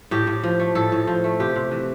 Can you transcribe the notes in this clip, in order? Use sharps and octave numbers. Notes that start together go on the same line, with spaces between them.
A2 G4
A2
F3
A3
A2 A4
A2
F3
A3
C3 G4
C3
E3